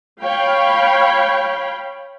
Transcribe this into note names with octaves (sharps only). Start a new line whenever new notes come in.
C#5 F5 G5 B5